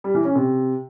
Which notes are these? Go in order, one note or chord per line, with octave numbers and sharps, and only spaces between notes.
G3
E3
C#4
C3